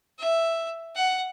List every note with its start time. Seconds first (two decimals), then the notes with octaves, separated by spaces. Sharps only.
0.19 E5
0.96 F#5